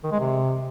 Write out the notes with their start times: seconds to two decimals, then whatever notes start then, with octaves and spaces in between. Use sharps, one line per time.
0.03 D#3
0.11 G#3
0.19 C3